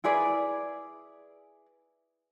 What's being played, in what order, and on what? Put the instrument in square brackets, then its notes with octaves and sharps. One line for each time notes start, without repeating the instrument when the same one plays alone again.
[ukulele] E4 G#4 B4 D5